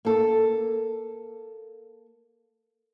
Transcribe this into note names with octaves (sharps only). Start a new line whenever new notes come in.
A#3 A4